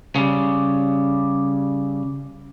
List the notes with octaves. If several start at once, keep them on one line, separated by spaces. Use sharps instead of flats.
C#3 G3